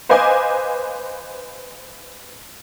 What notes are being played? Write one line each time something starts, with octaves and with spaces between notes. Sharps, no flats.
B4 C5 D#5 F5 G#5 D6